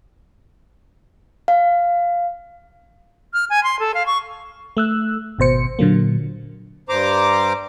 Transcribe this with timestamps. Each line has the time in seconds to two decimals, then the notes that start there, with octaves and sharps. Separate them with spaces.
1.48 F5
3.33 F6
3.50 G#5
3.64 C6
3.80 A4
3.94 F5
4.06 C#6
4.77 A3 E6 F#6
5.39 G#1 B2 C5 C#7
5.79 A#2 D3 F#3 A#3
6.89 G2 C5 A#5 D6